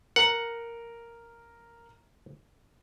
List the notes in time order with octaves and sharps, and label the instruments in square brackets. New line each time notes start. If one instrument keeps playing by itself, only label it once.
[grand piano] A#4 A#5 [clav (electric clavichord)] F#5